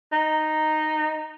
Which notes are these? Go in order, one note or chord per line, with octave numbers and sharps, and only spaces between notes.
D#4